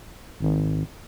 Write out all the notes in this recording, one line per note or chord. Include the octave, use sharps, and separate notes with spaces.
G#1